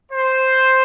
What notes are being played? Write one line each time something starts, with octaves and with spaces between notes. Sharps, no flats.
C5